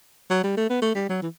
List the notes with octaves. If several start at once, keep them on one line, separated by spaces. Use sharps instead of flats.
F#3
G3
A3
B3
A3
G3
F#3
E3